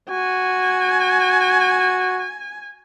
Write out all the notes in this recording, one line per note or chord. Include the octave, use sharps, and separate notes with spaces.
F#4 G#5